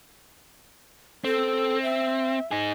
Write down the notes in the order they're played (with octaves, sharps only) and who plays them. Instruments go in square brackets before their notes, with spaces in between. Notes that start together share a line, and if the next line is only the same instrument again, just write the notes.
[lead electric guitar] C4 [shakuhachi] A4
[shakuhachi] E5
[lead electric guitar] D#4 G#4